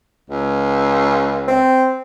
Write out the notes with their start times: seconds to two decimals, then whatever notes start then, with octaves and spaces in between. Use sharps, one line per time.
0.30 C#2
1.48 C4